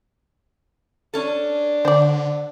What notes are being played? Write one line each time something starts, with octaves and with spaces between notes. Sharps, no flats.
C#4 D4 A4
D3 C5 D5